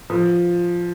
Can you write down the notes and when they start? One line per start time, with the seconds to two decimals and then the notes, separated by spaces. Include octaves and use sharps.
0.10 F3